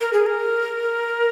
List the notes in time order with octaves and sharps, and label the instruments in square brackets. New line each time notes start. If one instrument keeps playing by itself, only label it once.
[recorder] A#4
G#4
A#4